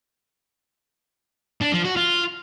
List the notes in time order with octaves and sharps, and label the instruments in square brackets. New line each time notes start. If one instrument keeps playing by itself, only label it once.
[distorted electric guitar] D4
F3
F#4
F4